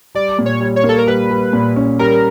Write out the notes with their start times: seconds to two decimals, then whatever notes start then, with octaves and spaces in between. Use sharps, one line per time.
0.15 G3 D5
0.39 A#2
0.46 C#5
0.61 G3
0.76 C#5
0.84 A#3
0.89 A4
0.98 A#4
1.07 G3 B4
1.31 G3
1.53 A#2
1.76 C#4
1.99 G3 A#4